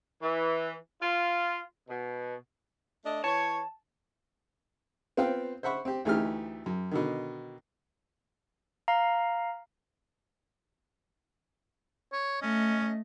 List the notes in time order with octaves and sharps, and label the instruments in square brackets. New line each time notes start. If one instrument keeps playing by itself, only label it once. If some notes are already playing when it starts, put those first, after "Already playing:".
[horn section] E3
F4
B2
[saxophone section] A3 D4 D#5
[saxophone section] E3 C#5 [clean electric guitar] A5
[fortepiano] B3 C4 F4 F5 G5
C5 E5 F#5 B5 C#6
C4 G4
D2 E3 A3 D#4 G4 F6
F#2
B2 D3 D#3
[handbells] F5 A#5
[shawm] C#5
[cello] A3 D#5 [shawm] C#4